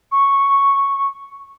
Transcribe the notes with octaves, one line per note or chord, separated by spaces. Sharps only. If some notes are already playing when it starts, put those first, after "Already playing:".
C#6